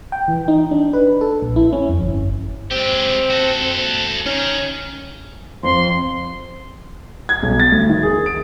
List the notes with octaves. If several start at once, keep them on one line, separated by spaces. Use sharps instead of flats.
G5
E3
D#4
D4
B4
A4
A#1
E4
C#4
F2
G1
G#3 C4 G4
F#4 A4
D#3 C#4
F2 C6
G#6
B1
A6
D2
D#3
G#4
D7